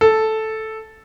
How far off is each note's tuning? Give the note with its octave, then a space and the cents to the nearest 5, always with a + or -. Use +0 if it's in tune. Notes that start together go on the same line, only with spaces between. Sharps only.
A4 -5